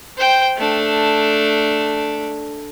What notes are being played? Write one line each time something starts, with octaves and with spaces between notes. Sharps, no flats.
C5 G5
A3 D4